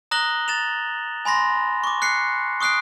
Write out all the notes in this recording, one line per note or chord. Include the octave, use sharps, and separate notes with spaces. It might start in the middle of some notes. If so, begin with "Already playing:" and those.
A#5 D#6 F#6 A#6 F#7 G7
A6 E7 F7
G#5 B5 C6 A#6
C#6 D6
F#6 C7 C#7
C#6 D#6 F#6 C7 D7